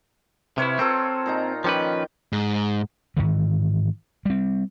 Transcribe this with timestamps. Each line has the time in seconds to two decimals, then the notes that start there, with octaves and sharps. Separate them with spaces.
0.58 C3 E4 B4 C#5 F5
0.79 C4 F4 A4 A#4
1.26 A#2 D#4 A#5
1.64 D#3 F3 C#4 B4 G5 D6
2.33 G#2
3.17 G#2 C3 D#3 E3
4.26 G3 C4